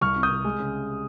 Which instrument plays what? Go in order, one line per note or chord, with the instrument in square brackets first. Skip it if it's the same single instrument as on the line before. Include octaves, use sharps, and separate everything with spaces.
[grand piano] C2 C#6 F6
C3
D#6 G6
C3
G#3
C#3